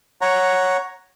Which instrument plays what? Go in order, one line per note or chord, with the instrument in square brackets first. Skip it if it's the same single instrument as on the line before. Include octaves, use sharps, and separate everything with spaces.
[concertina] C#5 F#5 A#5